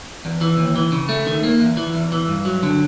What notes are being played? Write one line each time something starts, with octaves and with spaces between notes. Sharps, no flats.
E2
E3
D#2
E3
C#3
A3
D#3
A#3
E2
E3
E2
E3
G2
F#3
D3